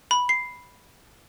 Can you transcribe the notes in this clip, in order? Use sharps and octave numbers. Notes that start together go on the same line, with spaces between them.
B5
C7